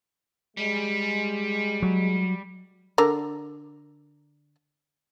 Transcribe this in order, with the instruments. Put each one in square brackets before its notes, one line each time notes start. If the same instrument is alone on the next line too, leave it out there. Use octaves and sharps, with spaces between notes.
[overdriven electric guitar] G3 [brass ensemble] G#3
[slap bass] F#3
[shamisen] D3 A#4